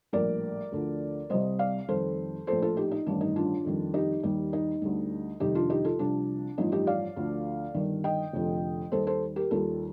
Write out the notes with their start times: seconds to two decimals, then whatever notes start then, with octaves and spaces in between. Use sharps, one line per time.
0.13 A#1 A2 G3 A#4 D5
0.72 D2 D3 F3
1.30 C2 C3 G3 C5 D#5
1.59 D5 F5
1.88 F2 D#3 G3 A4 C5
2.47 A#1 A2 F3 A4 C5
2.62 F4 A4
2.77 D#4 G4
2.91 D#4
3.07 A1 G2 D#3 D4
3.21 D#4
3.36 D4 F4
3.65 F2 D#3 G3
3.94 D#4 G4
4.23 D#2 D#3 G3 D#4
4.53 D#4
4.82 D2 D3 G3
5.40 F2 C3 D#3 G3 D#4 G4
5.55 D4 F4
5.70 D#4 G4
5.84 F4 A4
5.99 C2 C3 F3 D4
6.58 A1 G2 F3 D#4
6.72 D#4 G4
6.87 D5 F5
7.16 D2 D3 F3
7.75 G1 G2 D#3
8.04 D#5 G5
8.33 F1 F2 D3 F3
8.92 D#2 D#3 G3 A4 C5
9.07 A4 C5
9.36 G4 A#4
9.51 D#2 D#3 G3 F4 A4